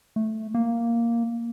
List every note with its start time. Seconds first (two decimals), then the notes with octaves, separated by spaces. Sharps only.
0.16 A3
0.54 A#3